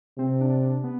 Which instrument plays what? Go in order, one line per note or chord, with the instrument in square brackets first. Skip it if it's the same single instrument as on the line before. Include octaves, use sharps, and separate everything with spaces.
[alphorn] C3 [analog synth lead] C4
[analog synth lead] D4
D4
B3